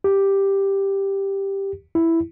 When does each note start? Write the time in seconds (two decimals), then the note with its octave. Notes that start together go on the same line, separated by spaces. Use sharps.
0.04 G4
1.95 E4